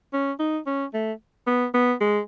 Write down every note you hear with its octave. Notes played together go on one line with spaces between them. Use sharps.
C#4
D#4
C#4
A3
B3
B3
G#3